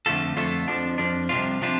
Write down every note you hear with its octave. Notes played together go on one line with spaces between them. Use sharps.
F2 D3 A3 F4 A4
F2 D3 A3 F4 A4
F2 F3 D4
F2 F3 D4
C2 C3 F3 D4 F4
C3 F3 D4 F4